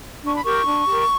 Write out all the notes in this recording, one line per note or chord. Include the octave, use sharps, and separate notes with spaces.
D4 C#6
B5
G4 A#4 C#6
D4
G4 A#4